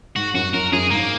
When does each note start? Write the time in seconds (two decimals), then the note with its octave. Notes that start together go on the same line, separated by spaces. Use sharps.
0.16 G#2 F#4
0.34 F#2 F#4
0.53 F#2 A#4
0.72 F#2 G#4
0.90 G#2 A#3